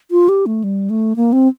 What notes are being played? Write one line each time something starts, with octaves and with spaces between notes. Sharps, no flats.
F4
G4
A3
G3
A3
A#3
C4